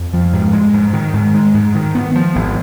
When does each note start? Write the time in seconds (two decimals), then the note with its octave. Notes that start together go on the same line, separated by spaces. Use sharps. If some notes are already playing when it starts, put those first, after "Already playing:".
Already playing: F2
0.13 F3
0.33 G#2
0.53 G#3
0.74 G#2
0.93 D#3
1.14 G#2
1.34 G#3
1.54 G#2
1.75 D#3
1.95 B3
2.15 F3
2.35 G#1